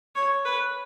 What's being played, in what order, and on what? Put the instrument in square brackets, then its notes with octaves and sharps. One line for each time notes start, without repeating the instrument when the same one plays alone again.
[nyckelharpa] C#5
B4